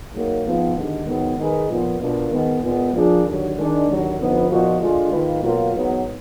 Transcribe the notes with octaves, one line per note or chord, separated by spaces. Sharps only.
G#2 F#3 A#3
G#2 F3 B3 F4
D#2 D3 G#3 D#4
G#2 D#3 F#3 B3
D#3 G#3 D#4 G#4 B4
A#2 F3 B3 F4
B2 A#3 D4 F4 A#4
D#3 G#3 B3
A#2 G#3 B3
F3 A#3 D4 G#4
D#2 D3 F#3
D#3 G#3 D4
D#2 D3 F#3
F2 D3 F3 B3 D#4
A#2 F3 B3 D#4 F#4
D3 G#3 D4 F4
G#2 D#3 A#3 F4 B4
B2 F#3 A#3 F4
G#2 F#3 B3